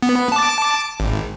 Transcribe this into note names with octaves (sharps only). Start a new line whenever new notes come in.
B3
A5 D6
G#1